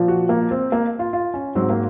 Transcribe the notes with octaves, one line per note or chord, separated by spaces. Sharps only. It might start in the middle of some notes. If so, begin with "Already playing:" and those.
Already playing: A#2 F3
F#4
A#3
C4
A#3
F4
F4
C#4
G#2 F#3 C4
A#3